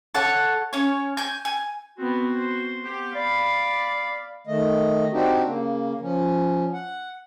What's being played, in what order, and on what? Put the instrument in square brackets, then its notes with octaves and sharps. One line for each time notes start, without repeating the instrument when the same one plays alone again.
[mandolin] A4 C#5 F#5
C#4 C#5
G#5 G6
G#5
[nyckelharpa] B3 C4 [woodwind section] F#4
[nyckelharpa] C5
[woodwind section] B3 G4
[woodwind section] D5 [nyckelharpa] F5 B5
[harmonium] D#3 A3 D#5
C4 D4 D#4 F#4 G4
C#3 A#3
F3 C#4
F#5